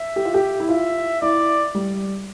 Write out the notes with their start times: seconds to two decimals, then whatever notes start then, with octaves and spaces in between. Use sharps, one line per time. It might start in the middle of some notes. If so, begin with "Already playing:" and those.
Already playing: E5
0.16 G4
0.25 F4
0.34 G4
0.60 E4
0.69 F4 E5
1.22 E4 D5
1.75 G3